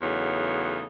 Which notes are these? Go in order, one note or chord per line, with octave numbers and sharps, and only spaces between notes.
E2 C#3 F#3 A3 D#4